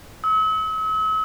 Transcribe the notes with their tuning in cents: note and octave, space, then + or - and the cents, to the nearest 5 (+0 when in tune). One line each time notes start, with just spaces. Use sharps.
E6 -45